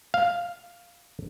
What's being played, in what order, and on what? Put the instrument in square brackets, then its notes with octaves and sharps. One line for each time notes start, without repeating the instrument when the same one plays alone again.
[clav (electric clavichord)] F5